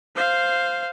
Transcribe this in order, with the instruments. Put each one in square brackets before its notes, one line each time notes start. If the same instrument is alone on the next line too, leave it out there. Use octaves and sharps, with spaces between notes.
[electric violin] C5 F5